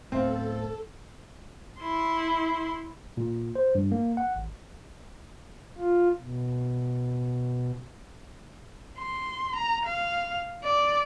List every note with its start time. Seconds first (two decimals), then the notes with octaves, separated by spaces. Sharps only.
0.12 D1 A2 B3 C4 A4 C5 E5 F5
1.80 E4 C6
3.17 A#2
3.55 C5
3.75 G2
3.92 A#3
4.17 F#5
4.36 G#1
5.78 F4
6.22 B2
8.99 C6
9.56 A#5
9.86 F5
10.64 D5